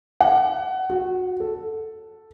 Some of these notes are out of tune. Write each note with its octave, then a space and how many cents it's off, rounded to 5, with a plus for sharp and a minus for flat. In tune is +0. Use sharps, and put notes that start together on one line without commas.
F#5 +25
F#4 -20
A4 +0